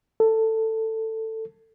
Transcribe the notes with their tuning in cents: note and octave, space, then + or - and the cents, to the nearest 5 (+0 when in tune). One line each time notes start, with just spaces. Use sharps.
A4 +15